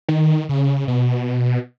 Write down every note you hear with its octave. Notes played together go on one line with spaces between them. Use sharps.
D#3
C#3
B2